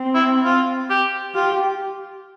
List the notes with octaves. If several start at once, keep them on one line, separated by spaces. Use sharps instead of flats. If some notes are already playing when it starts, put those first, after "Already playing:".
Already playing: C4
E4
F4
G4
F4 G4